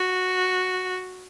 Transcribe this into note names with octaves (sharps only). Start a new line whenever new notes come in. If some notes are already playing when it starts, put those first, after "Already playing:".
Already playing: F#4